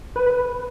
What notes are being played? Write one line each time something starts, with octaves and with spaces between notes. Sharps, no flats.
B4